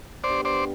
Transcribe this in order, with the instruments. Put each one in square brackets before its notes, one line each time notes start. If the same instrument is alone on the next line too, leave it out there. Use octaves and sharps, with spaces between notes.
[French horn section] B3 D4 G4 [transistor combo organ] C5 D5
[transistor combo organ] C5 D5